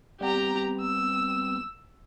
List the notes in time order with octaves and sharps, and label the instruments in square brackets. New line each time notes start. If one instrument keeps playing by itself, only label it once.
[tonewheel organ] G3 B3 C4 [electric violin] G4 A#5
[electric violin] E6